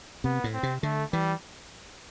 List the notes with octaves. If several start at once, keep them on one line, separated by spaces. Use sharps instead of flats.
C3 B3
A2
C4
C3
D3 A3
E3 G3